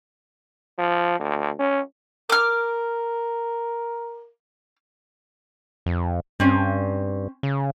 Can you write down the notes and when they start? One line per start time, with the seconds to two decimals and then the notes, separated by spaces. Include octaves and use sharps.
0.78 F3
1.19 D2
1.59 C#4
2.30 A#4 D6 F6
5.86 F2
6.40 G2 C4 C#4
7.43 C#3